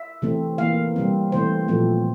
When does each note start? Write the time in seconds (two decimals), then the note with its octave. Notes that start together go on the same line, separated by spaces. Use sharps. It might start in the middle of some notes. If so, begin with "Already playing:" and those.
Already playing: E5
0.22 C3 E3 A3 C4
0.58 E3 A#3 F5
0.96 C3 G3 C4
1.32 C3 E3 A3 C4 C5
1.68 A#2 F3 A3 C4